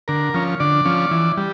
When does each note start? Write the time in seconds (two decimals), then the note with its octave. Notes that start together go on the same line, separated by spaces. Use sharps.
0.08 D3 A#4
0.34 F3 C#4
0.60 D3 D5
0.85 F3 C#4
1.11 E3
1.37 G3